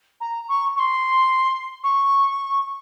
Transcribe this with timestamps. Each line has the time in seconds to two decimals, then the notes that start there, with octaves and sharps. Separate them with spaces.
0.20 A#5
0.48 C#6
0.75 C#6
0.78 C6
1.83 C#6